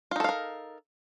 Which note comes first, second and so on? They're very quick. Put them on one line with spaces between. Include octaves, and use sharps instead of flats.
F4 D#4 A4 F5 A#4